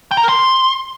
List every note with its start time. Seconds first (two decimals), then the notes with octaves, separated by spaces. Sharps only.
0.11 G5
0.17 A#5
0.23 A#4
0.29 C6